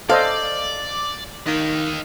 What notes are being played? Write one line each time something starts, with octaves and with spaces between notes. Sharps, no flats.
A4 C5 D5 D#5 F5
D#3 D#5 F5